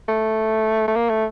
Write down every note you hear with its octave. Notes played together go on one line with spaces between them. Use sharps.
A3
A3
A#3
A3